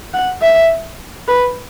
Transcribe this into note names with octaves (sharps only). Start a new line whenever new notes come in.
F#5
E5
B4